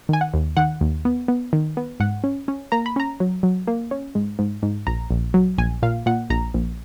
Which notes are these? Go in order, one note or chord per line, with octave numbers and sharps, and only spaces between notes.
D#3 G#5
F#5
D#2
D#3 F#5
D#2
B3
B3
D#3
B3
G#2 F#5
C#4
C#4
A#3 A#5
B5
C#4 A#5
F#3
F#3
A#3
C#4
G#2
G#2
G#2
A#1 A#5
A#1
F#3
A#1 G#5
A#2 F5
A#2 F#5
A#1 A#5
A#1